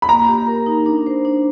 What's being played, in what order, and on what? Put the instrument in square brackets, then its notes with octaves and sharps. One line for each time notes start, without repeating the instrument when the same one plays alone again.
[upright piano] B5
[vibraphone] A#3 [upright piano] A#5
[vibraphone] G4
A#4
D#4
D4
C5
D4